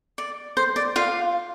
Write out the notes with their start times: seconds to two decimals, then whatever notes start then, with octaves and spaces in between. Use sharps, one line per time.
0.18 D5
0.57 C5
0.76 D5
0.96 F4 F5